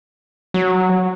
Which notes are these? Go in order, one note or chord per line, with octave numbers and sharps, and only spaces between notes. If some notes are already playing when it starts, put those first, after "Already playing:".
F#3